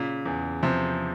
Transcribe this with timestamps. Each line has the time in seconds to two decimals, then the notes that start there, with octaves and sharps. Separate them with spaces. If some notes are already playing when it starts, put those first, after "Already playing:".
Already playing: A#2 C#3
0.26 E2
0.63 C3 F3